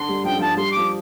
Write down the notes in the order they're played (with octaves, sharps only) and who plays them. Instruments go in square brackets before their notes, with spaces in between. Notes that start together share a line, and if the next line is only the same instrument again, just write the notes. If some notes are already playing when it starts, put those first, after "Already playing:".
Already playing: [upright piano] D3 [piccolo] C6
[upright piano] G3
[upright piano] F3 [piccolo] G5
[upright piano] D3
[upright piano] F3 [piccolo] A5
[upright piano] G3 [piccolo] C6
[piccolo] D6
[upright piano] F3